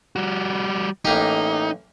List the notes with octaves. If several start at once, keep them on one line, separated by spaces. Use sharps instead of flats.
G3 F#4
A1 A#3 D#4 G4